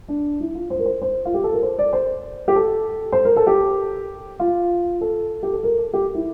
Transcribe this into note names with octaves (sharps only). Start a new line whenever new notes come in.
D4
E4
F4
C5
A#4
C5
C5
F4
G4
A4
A#4
C5
D5
C5
G4
A4
C5
A#4
A4
G4
F4
A4
G4
A4
A#4
A4
G4
E4